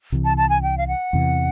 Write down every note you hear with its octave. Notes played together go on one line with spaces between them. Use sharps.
C2 C3 E3
A5
A5
G#5
G5
F5
F#5
E2 C3 E3